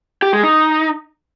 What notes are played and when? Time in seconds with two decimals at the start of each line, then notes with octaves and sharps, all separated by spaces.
0.22 G4
0.33 G#3
0.44 D#4